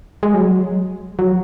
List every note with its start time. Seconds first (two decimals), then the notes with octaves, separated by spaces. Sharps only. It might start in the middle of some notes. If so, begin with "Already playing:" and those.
0.23 G#3
0.34 F#3
1.19 F#3